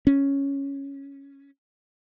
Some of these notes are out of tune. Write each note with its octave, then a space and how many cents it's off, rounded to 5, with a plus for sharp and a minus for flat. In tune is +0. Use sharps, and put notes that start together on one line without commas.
C#4 +0